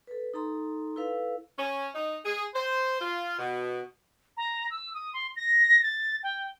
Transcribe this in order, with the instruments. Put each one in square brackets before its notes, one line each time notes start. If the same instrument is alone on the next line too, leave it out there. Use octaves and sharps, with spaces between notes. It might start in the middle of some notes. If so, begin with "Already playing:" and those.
[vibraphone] A4 B4
D#4 A4 A#5 C6
E4 A4 B4 F5
[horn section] C#4
D#4
G#4
C5
F4
B2
[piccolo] A#5
E6
D#6
C6
A#6
A6
G5